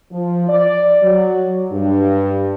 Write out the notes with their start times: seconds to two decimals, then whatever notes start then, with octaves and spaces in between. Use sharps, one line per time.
0.12 F3
0.49 D5
1.02 F#3
1.71 G2